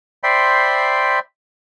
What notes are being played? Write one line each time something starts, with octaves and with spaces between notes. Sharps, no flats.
C5 D5 E5 G5 B5 C6